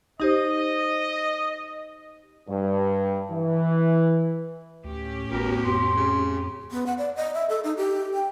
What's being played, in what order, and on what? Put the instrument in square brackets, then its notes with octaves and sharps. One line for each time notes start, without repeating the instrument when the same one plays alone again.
[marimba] D#4 G4 C5 [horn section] D#5
[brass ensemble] G2
E3
[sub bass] D2 [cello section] A2 C#4 G4
[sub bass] G#1 [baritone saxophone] B2 [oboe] A#4
[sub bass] F2 [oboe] C6
[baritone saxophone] C#3
[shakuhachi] B3
F#5
D5
D#5
E5
A4
D#4
G4
G5